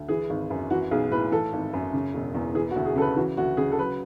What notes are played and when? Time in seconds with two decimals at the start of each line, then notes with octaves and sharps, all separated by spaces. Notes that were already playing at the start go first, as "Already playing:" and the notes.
Already playing: D2
0.08 E3 G#4
0.30 G#1
0.50 F#2
0.70 E3 F#4
0.91 B1 G#4
1.11 A2 B4
1.32 E3 A4
1.53 G#1
1.73 F#2
1.94 C#3
2.14 E1
2.34 E2
2.55 E3 G#4
2.71 F#4
2.76 D2
2.85 G#4
2.96 C#3 A4
3.01 B4
3.17 E3 F#4
3.37 D2 F#4
3.57 C#3 G#4
3.72 A4
3.79 F#3 B4